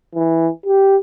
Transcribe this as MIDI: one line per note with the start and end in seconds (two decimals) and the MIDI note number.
0.15 0.50 52
0.66 0.97 67